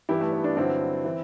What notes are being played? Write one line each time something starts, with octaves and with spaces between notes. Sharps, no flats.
G2 E3 E4 G4
A3
B3
B3 D4
G2 D3 F#3 C4 E4
E3